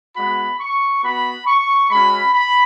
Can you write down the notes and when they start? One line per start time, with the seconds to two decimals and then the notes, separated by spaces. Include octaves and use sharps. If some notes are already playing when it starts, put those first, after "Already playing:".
0.17 G#3 B3 F#4 B5
0.60 C#6
1.03 B3 F#4 B5
1.47 C#6
1.90 G#3 C#4 F#4 B5
2.34 B5